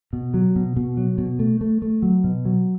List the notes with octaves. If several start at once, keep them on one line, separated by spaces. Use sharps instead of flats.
B2
F#3
B2
B2
F#3
B2
A3
A3
A3
F#3
B2
F#3